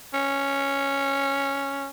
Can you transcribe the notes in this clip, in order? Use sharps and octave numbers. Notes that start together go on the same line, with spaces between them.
C#4